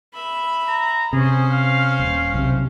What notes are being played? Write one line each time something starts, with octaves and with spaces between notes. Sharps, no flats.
E5 B5
A#5
C3 C#4 G#4 C5
F5
D#1
B1 C3